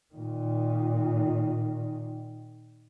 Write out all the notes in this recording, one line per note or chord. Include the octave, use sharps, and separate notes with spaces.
A#2 D#3